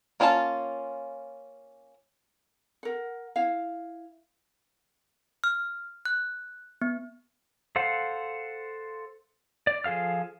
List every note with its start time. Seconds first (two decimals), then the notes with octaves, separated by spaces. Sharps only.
0.20 A#3 C#4 F4 G#4 A5
2.83 A#4 F#5
3.36 E4 F5
5.44 F6
6.06 F#6
6.82 B3
7.76 A4 C5 F5 F#5
9.67 D5
9.84 F3 G#4 A4 F5 F6